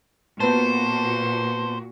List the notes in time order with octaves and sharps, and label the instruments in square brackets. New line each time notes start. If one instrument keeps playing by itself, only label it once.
[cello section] A#2 F#4 [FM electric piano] B3 B4 A5 [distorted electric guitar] C5